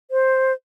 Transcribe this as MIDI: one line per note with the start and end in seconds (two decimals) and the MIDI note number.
0.11 0.53 72